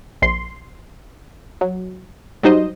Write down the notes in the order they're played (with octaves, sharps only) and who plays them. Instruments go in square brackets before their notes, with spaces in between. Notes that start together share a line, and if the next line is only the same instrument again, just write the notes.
[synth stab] A#1 C6
F#3
F#3 G3 D#4 C5 D#5